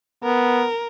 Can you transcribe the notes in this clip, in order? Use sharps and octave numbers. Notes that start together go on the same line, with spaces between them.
B3 A#4